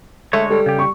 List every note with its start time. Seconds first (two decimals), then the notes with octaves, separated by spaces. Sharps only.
0.33 D3 G#3 A3 C#5
0.50 G3 A4
0.66 C#3 G4
0.79 C#6